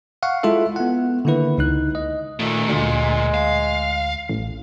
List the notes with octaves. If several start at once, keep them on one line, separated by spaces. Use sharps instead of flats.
F5 F#5 C#6
G#3 E4 F4 A4 E5
B3 F#5
D3 D#3 A#3 E4 B4
C#2 D#4 F#6
D#5
A#2 D#3 A3
D2 A#2 G#3
F5
A1